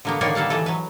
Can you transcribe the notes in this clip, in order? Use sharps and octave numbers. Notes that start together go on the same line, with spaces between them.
D3 A#3 B3
D3 D#3 A#3 B3 C#5 D5
G3 A#3 A4 F5 F#5
E3 G#3 A4
F#3 B4